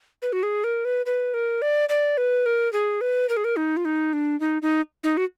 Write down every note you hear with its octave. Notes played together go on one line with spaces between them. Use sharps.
B4
F#4
G#4
A#4
B4
B4
A#4
D5
D5
B4
A#4
G#4
B4
A#4
G#4
A#4
D#4
F4
D#4
D4
D#4
D#4
D#4
F#4